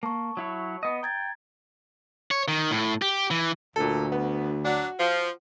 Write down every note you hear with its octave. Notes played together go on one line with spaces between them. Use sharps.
A#3 A5 C#6
F#3 E4 C#5
B3 D#5
G5 A#5 G#6 A6
C#5
D#3
A2
G4
E3
D2 A#2 A4
B3
F#3 D4 F#4
F3